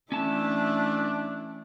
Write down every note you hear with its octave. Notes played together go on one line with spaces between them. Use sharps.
E3 A3 C#4 D4 E4 A5